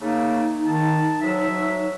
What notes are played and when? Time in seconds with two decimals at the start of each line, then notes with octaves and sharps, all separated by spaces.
0.01 C#3 A3 A#3 D#4
0.65 D#3 A5
1.21 D2 F#3 G#3 E5
1.50 F#3